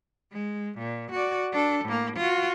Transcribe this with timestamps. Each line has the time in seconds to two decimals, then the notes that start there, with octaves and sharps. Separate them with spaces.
0.33 G#3
0.78 A#2
1.12 F#4 D5
1.52 D4 A4
1.85 A2 A#3
2.16 F4 F#4